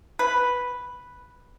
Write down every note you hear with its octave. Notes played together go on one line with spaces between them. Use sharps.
B4